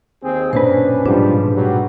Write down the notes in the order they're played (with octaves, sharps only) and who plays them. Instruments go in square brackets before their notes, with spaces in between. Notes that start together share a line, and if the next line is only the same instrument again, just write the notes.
[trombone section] D#2 C4 G#4
[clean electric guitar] B1 A#2 B4 [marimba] G2 C5 [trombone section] C#4 D4
[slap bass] G#2 [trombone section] F3 G3 [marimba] D4
[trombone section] F#3 G3